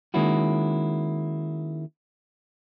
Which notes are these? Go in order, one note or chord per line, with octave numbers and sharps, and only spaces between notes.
D#3 G#3 A#3 C#4 E4 F#4